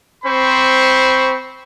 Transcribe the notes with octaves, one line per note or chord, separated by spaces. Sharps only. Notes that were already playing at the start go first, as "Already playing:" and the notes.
C4 C5 B5 C#6